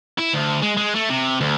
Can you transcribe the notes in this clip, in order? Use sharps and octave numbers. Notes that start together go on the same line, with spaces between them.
E4
D2
G#3
G#3
A3
C3
D2